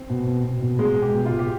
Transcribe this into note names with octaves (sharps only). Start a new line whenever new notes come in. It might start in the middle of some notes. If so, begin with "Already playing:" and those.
Already playing: C4
B2
B2
B2
B2
B2 G#3 G#4
B2 G4
B2
F4
B2
G4